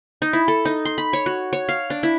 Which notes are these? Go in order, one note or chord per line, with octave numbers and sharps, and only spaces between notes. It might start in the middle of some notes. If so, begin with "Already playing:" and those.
D#4
E4
A4
D#4
C6
B5
C#5
F#4
C#5
F5
D4
E4